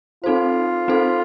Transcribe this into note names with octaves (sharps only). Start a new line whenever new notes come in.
C4 D#4 F4 A4 C5
C4 D#4 A4 C5